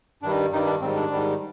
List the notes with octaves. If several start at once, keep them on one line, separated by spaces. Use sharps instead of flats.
G2 D#3 G3 D4
G2 D#3 G3 D#4
D4
G#2 D#3 G3 C4
D4
G#2 D#3 G3